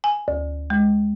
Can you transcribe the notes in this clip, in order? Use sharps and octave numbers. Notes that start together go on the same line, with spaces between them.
G#5
D2
G#3